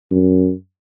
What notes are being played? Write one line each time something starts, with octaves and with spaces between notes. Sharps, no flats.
F#2